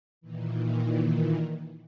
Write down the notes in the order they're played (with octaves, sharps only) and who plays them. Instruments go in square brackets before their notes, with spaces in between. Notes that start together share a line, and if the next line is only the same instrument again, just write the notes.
[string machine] A#2 D#3 E3